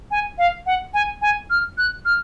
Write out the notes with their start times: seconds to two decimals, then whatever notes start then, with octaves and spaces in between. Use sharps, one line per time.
0.11 G#5
0.38 F5
0.66 F#5
0.94 G#5
1.22 G#5
1.50 F6
1.78 F#6
2.05 F6